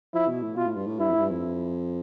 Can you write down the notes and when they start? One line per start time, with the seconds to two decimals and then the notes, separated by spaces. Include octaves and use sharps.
0.13 F3 E4
0.28 B2
0.42 A2
0.56 B2 F4
0.66 A2
0.76 G2
0.87 A2
0.99 G2 E4
1.09 F2
1.14 A2
1.20 G2
1.31 F2